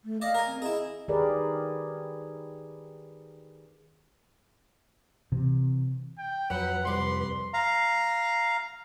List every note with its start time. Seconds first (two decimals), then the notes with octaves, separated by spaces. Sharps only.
0.05 A3
0.22 D5 D#5 F5
0.35 A#4 G#5
0.47 C4
0.62 E4 G#4 D#5
1.08 D#3 G4 G#4 A#4 B4 D5
5.32 C3 E3 C4
6.18 G5
6.50 F2 F#3 B4 F#5
6.85 C2 C6 D6
7.54 F5 A#5